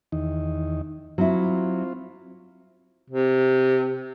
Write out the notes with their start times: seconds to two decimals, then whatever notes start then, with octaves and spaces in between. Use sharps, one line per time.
0.12 E2 D#3 D#4
1.18 F#3 C4 E4 F4
3.10 C3